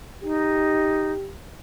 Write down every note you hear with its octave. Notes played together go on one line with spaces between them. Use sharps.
D#4 G4